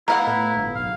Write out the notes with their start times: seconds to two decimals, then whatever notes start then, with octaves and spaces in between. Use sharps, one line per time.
0.08 B3 E4 F5 F#5 A#5
0.27 A2
0.57 G1
0.75 B1 F5